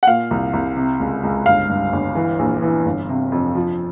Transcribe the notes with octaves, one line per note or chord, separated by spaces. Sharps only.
F#5
A#2 F5
C2
C2
C3
C#2
C#2
G1 F5
G2
G1
E3
A#1
E3
G1
C3
F2
F3